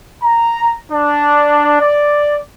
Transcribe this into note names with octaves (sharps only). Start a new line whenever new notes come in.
A#5
D4
D5